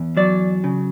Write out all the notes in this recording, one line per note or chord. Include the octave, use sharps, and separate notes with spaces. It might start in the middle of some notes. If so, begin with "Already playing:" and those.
Already playing: E2
F#3 D5
C#3